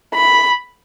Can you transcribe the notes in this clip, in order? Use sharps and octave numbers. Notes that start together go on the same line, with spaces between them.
B5